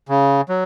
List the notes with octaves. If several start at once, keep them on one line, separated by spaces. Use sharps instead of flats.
C#3
F#3